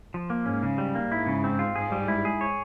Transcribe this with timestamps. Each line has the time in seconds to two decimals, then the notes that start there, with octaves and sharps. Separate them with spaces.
0.14 F3
0.30 A#3
0.46 G#2 C#4
0.63 C#3
0.78 G3
0.95 A#3
1.12 G#2 E4
1.27 C#3
1.44 C4
1.59 F4
1.76 G#2 G#4
1.92 G3
2.08 E4
2.25 G#4
2.41 C#5